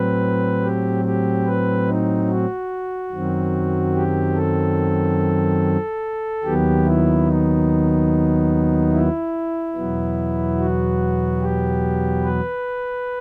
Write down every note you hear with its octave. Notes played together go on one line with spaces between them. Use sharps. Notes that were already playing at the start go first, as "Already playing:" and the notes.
Already playing: A2 F#3 C4 B4
G4
G4
B4
D#4
F#4
F#2 D#3 F#3 C4
G4
A4
D#2 D#3 F#3 B3 G4
E4
D#4
E4
E2 B2 F#3 B3
F#4
G4
B4